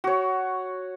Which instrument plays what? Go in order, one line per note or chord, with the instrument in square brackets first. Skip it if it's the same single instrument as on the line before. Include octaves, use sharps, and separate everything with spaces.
[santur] F#4 C#5